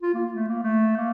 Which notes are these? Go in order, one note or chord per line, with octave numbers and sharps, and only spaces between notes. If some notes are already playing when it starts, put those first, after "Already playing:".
F4
A#3
A3
A#3
A3
A#3